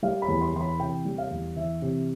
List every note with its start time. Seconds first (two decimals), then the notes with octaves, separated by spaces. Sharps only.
0.03 G3 F5
0.22 B5
0.28 E2
0.41 C6
0.54 E3 C6
0.61 B5
0.79 C3 G5
1.05 G3
1.18 F5
1.31 E2
1.56 E3 E5
1.82 C3